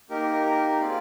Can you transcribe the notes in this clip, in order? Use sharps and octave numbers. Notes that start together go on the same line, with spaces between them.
A#3 D#4 G4 A#4
A#4
C4 F4 G#4 D5 F5